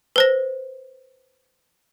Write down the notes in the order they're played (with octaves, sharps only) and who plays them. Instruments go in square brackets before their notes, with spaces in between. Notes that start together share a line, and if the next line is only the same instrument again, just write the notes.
[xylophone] B4 C5 A#6